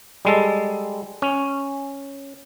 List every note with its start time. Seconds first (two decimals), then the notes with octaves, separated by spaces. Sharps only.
0.25 G3 G#3 A4
1.22 C#4